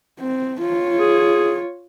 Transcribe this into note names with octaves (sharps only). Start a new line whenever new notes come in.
C4
F4 C#5
G#4